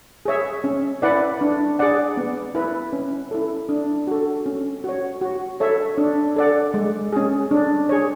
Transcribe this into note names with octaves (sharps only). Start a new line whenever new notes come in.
G#4 C#5 E5
C#4
E4 B4 D5 F#5
D4
G#4 D5 F#5
B3
E4 B4
C#4
E4 A4
D4
F#4 A4
C#4
F#4 C#5
F#4
A4 C#5 E5
D4
A4 D5 F#5
G#3
C#4 G#4
D4
G#4 C#5